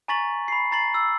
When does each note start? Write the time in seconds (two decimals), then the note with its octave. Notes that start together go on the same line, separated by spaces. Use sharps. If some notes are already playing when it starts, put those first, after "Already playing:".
0.08 G#5 A#5 C#6 A6 B6 F#7
0.48 B5 C7
0.72 A#5 A6 C7 F#7
0.94 E6